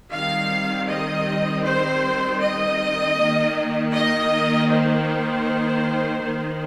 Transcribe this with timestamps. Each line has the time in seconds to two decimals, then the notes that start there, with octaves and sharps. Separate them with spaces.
0.11 D#3 G3 C4 F5
0.88 D#5
1.64 C5
2.41 D#5
3.18 D#3 A#3
3.94 D#5
4.70 C5
6.23 D#3 A#3